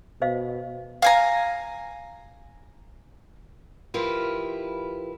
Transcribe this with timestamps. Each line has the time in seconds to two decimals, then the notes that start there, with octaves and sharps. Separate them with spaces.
0.22 B2 C5 D#5 F5
1.02 F5 G#5 A#5
3.94 F3 E4 F4 G4 A#4 B4